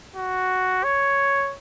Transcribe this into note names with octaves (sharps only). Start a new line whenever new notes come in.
F#4
C#5